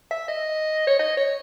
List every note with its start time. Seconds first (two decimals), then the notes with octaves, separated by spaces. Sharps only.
0.11 E5
0.28 D#5
0.87 C#5
0.99 D#5
1.17 C#5